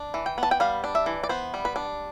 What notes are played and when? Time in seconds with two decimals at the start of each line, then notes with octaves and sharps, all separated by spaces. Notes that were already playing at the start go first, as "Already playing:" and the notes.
Already playing: D4
0.14 E3
0.26 G5
0.38 B3
0.43 A5
0.51 G5
0.60 G3 F5
0.84 D4
0.95 E5
1.06 E3
1.23 D5
1.29 B3 C5
1.54 G3
1.65 B4
1.76 D4